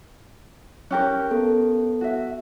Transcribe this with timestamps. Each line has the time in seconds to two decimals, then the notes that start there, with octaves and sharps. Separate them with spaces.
0.91 C#4 G4 A#4 F#6
1.31 B3 A4
2.01 F#4 E5